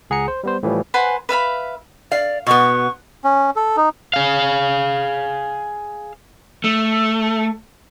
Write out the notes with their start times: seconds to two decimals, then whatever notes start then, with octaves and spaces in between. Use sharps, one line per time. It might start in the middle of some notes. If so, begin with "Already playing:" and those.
0.10 C#2 G#4 F#5 A#5 C#7
0.28 C5
0.44 G3 B3 C5
0.63 A2 E3 F3 G3
0.94 B4 C5 F#5 G#5
1.29 B4 E5 F5 B5
2.12 D5 F5
2.47 B2 B3 C#6
3.24 C#4
3.56 A4
3.77 D#4
4.14 G#4 F5
6.64 A3